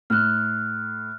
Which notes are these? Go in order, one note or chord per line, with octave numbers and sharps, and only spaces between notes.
A2 F6 F#6